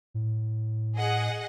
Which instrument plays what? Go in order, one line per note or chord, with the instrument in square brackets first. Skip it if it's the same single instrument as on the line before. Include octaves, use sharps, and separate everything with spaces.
[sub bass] A2
[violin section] G#4 D#5 F#5